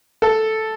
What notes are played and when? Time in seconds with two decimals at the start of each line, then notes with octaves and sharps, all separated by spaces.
0.22 A4